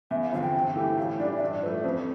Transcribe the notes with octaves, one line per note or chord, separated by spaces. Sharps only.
E2 E5
F5
D3 F3 C4 F5
G5
G2
E3 A3 E4 G4
A2 F5
E3 G3 D4 D5
E5
G2 D5
F3 A3 B4
F2 C5